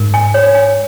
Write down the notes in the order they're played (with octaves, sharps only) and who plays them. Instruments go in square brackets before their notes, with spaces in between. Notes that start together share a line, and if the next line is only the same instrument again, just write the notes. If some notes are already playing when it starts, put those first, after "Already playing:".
Already playing: [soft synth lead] G#2 [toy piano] A#4
[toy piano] G#5
C#5
G#5